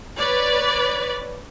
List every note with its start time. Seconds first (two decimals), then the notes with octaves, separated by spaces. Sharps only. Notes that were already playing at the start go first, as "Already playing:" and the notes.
0.18 B4 C#5 D5